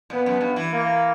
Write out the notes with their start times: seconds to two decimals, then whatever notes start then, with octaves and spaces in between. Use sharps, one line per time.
0.10 A#2 B3
0.26 F#2
0.41 G2
0.56 E3
0.71 A#3